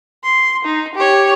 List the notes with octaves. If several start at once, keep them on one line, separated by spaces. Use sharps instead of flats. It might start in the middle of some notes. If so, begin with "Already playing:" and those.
C6
D#4
G4 C#5